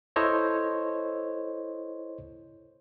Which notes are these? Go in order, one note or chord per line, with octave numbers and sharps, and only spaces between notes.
E4 A4 C5 C#5 D#5